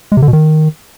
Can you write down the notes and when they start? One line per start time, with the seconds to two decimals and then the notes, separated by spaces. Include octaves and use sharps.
0.12 G#3
0.17 C3
0.22 D3
0.28 B2
0.33 D#3